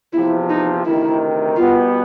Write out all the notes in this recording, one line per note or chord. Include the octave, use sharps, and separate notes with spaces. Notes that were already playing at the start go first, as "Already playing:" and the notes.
E2 C3 F3 E4
D#4
D2 C3 D#3 E4
B2 G3 B3 F4